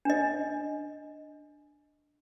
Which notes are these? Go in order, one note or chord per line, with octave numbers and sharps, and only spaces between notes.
D4 D#5